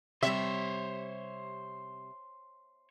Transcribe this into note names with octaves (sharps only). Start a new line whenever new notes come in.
C3 G3 C5 C#5 E5